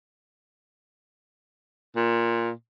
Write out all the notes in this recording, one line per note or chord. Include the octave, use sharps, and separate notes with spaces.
A#2